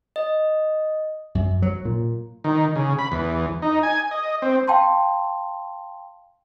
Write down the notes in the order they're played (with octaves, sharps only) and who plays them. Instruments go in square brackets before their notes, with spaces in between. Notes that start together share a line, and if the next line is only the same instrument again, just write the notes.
[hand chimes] D#5
[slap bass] F#2
F#3
A#2
[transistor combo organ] D#3
C#3
B5
E2
D#4
G#5
D#5
C4
[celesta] F5 G5 A5 C6